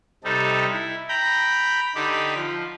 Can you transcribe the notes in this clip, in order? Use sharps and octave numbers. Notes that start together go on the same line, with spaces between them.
C3 G3 D#4 A4
E4
G5 A#5 B5 G6
D3 D#4 G4 B5
F3